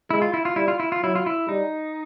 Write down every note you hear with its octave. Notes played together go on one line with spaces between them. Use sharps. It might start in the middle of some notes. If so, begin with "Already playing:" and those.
G#3 E4
F4
E4
F4
G3 E4
F4
E4
F4
F#3 E4
F4
E4
G3 D#4